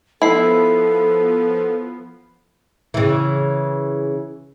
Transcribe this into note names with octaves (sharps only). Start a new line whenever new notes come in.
F3 B3 E4 A4 B5 C7
C#3 E3